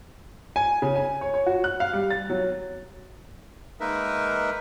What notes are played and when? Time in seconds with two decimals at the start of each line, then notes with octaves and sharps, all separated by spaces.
0.56 G#5
0.82 C#3
0.95 G#5
1.21 C#5
1.34 C#5
1.46 F#4
1.64 F#6
1.80 F5
1.93 G3
2.10 A6
2.30 F#3
3.80 G#3 A#3 D#4 A#4 B4 E5